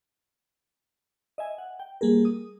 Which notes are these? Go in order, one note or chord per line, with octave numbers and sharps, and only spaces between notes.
D#5 E5 G#5
F#5
G5
G3 A#3 G#4 A#4
D#6